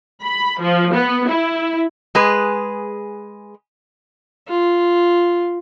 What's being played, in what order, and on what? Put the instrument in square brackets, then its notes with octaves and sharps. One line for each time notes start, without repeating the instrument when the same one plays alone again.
[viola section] B5
F3
B3
E4
[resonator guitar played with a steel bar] G#3 G#4 B4
[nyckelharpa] F4